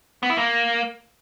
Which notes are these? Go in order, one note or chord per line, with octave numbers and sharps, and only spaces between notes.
B3
E4
A#3